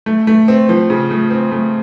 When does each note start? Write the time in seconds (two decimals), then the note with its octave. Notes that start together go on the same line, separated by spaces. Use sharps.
0.06 A3
0.27 A3
0.48 C4
0.69 F3
0.90 C#3
1.11 A3
1.30 C4
1.52 A3